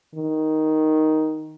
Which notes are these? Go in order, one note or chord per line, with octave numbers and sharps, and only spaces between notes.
D#3